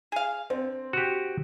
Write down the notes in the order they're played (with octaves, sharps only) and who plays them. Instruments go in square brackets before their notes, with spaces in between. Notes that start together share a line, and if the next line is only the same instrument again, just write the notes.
[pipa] G#4 F5
[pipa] D3 [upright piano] C4
[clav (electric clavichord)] F#4 G4